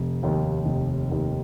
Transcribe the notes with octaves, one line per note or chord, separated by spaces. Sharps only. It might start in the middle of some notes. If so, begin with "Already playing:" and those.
Already playing: F1
D#2 D#3
F1
D#2 D#3